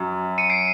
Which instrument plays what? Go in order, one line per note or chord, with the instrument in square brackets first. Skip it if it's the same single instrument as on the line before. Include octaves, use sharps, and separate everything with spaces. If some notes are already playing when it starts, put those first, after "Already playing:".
Already playing: [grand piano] F#2
[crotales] C#7 D#7
C7 D7